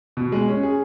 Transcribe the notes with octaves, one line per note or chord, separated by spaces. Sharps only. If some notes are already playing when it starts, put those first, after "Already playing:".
B2
G#3
C#4
G#4